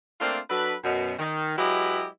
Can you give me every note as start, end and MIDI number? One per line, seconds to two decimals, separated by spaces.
0.20 0.39 57
0.20 0.39 58
0.20 0.39 60
0.20 0.39 62
0.20 0.39 65
0.50 0.75 54
0.50 0.75 62
0.50 0.75 69
0.50 0.75 71
0.83 1.14 42
0.83 1.14 47
1.18 1.53 51
1.57 2.06 54
1.57 2.06 56
1.57 2.06 64
1.57 2.06 67
1.57 2.06 71
1.57 2.06 75